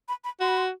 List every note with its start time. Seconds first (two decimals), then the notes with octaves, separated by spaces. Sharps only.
0.08 B5
0.24 B5
0.40 F#4 C6
0.49 B5
0.57 C6